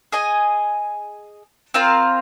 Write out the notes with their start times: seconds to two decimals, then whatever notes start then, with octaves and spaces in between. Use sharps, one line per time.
0.12 G#4 D#5 G#5
1.74 C4 F4 A#4 F5